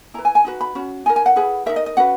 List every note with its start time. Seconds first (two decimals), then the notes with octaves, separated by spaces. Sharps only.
0.14 E4 B4 A#5
0.25 G#5
0.35 G#5
0.45 D#4 F#4 B4
0.61 B5
0.75 C#4 F#4
1.06 D#4 G#5
1.09 A#4
1.16 G#5
1.26 F#5
1.36 E4 G#4 B4
1.66 D#4 F#4 A#4 E5
1.76 D#5
1.86 D#5
1.97 C#4 F#4 B4 F#5